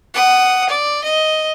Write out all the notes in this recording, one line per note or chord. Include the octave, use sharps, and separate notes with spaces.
F#5 D#6
D5
D#5